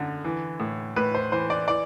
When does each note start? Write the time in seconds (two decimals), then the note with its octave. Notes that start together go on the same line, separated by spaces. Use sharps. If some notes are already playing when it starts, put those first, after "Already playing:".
Already playing: F#2 D3
0.24 E3
0.60 A2
0.96 A2 B4
1.15 C5
1.32 E3 C5
1.50 D5
1.68 E3 D5